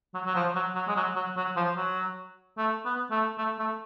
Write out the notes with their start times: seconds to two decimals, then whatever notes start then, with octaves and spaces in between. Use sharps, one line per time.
0.14 F#3
0.26 F#3
0.35 F3
0.55 F#3
0.75 F#3
0.88 G#3
0.96 F#3
1.16 F#3
1.37 F#3
1.56 F3
1.76 F#3
2.58 A3
2.85 B3
3.11 A3
3.38 A3
3.59 A3